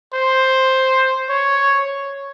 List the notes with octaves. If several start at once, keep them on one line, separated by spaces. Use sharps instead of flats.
C5
C#5